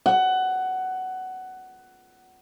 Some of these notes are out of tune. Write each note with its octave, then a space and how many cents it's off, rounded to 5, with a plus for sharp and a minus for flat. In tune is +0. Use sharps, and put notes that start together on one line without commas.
F#5 +15